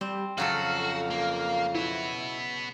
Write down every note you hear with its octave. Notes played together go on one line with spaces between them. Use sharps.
G3 C4
F2 C#3 F#3 F#4 A4 F5
A#3
B3 E4 F#4